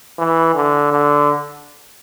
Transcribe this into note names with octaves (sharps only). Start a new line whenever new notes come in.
E3
D3
D3